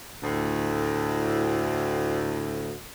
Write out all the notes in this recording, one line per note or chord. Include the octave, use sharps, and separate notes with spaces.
D2 A2